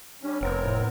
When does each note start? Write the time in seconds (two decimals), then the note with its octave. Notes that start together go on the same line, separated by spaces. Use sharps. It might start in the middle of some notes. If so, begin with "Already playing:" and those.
0.23 G3 C#4 D4
0.41 F1 B3 C4 A#4 C#5
0.64 A2